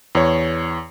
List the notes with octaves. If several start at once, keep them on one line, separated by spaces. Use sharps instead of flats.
E2 C#5